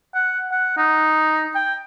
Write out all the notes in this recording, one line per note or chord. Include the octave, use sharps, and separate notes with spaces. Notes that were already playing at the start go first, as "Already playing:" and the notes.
F#5
F#5
D#4
G5